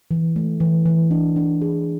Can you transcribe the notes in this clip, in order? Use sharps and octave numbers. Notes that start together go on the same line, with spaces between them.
E3
A3
E3
E3
D4
D4
G#4